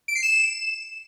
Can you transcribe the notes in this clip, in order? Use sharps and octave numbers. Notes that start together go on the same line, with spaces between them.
D7
C7
E7